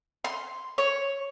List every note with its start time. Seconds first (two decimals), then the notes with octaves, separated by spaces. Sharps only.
0.24 C6
0.78 C#5